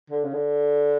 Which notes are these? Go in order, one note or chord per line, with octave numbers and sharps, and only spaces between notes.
D3
C#3
D3